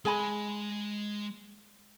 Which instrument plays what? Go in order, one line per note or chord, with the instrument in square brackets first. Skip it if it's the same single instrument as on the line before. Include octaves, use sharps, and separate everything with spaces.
[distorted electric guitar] G#3 C6 [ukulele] G#4 G#5 B5